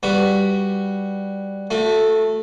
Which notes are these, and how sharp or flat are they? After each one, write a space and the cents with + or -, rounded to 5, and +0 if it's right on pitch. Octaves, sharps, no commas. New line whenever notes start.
G3 +0 F#4 +0 B4 +0
A3 +0 F#4 -35